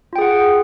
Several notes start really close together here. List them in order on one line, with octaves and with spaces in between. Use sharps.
F4 G5 G#4 F#5